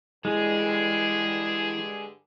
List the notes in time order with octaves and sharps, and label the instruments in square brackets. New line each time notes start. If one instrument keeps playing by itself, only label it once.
[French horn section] G2 D3 G#4 [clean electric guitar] E3 [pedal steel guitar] G#3